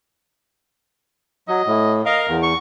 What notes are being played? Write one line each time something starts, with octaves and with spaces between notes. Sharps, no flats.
F#3 D#5
A2
A#4 D#5 F5
E2
C#6